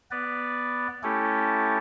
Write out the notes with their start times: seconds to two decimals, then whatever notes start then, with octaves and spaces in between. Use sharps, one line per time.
0.11 B3 B4 D5
1.03 A3 C#4 E4 G4 A4